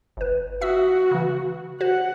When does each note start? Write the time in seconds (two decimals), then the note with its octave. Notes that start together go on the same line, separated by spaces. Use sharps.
0.17 G1 B4
0.61 F#4 E5 D#6 E6
1.11 C#3 E3
1.81 F#4 C5 F#5